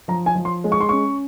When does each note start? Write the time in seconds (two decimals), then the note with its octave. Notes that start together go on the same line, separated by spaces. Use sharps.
0.08 F3 A#5
0.26 G#5
0.35 F3
0.45 C6
0.64 G#3
0.72 C#6
0.81 C6
0.89 C#4 C#6